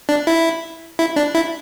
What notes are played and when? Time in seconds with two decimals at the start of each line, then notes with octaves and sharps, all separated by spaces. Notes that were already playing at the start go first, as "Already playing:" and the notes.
0.09 D4
0.27 E4
0.99 E4
1.16 D4
1.35 E4